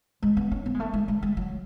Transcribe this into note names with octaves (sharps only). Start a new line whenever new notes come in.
G#3
B3
C#4
B3
G#3
A3
G#3
G#3
G#3
F#3